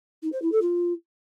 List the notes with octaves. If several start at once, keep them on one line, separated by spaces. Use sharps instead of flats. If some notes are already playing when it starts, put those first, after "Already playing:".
D#4
C5
E4
A4
F4